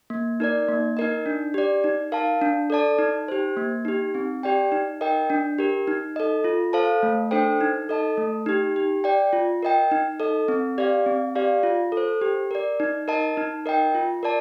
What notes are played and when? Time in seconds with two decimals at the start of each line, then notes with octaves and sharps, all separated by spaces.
0.10 A#3
0.40 D#4 A#4 D5
0.68 A#3
0.97 D#4 A#4 D#5
1.26 D4
1.54 G4 D5
1.84 D#4
2.12 A#4 F5 A5
2.42 D4
2.70 A4 D5 A5
2.98 D#4
3.28 G4 C5
3.57 A#3
3.85 D#4 G4
4.15 C4
4.43 G4 D5 G5
4.72 D#4
5.01 A#4 D#5 G5
5.30 D4
5.58 G4 A#4
5.87 D#4
6.16 A4 D#5
6.44 F4
6.73 A4 C5 F5 A5
7.03 A3
7.31 D4 A4 C5 G5
7.61 D#4
7.89 A4 D#5 A5
8.17 A3
8.46 D#4 G4
8.76 G4
9.04 D5 G5
9.33 F4
9.63 A#4 D#5 G5
9.91 D#4
10.20 A4 D#5
10.48 C4
10.78 G4 D5 F5
11.06 C4
11.35 G4 D5 F5
11.63 F4
11.92 A4
11.97 C5
12.21 G4
12.51 A#4 D5
12.80 D#4
13.08 A#4 D#5 A5
13.37 D#4
13.66 A#4 D#5 G5
13.95 F4
14.23 A#4 D5 A5